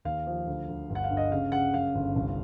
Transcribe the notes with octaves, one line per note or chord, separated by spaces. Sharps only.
D#2 F5
F3
D2
D2
G1
F#5
F5
G2
D#5
C#3 F5
C#3 F#5
F#2 F5
G1
C2